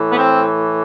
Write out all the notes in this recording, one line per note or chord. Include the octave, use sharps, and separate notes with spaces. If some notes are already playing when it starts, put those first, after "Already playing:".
Already playing: A2 E3
B3
C4